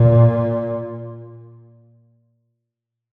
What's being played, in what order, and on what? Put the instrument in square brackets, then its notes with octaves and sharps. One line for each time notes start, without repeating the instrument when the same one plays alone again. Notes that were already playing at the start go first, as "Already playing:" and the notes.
Already playing: [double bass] A#2